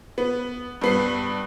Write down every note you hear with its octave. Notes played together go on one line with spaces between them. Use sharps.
B3
G2 B3 C7